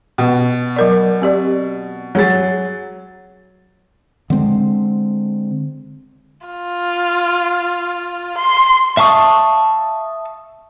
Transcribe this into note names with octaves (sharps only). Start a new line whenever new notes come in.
B2
F#3 A#4 D5
C4 G4 D5
F#3 G#4 A6
D3 G#3 C4
F4
C6
E5 F5 A5 C#6 D#6